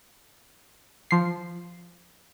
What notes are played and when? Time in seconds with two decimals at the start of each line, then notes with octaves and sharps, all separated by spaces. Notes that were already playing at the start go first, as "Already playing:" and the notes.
1.11 F3 C7